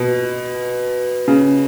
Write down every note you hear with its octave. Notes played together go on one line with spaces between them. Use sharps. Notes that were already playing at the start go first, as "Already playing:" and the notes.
Already playing: B2
C#3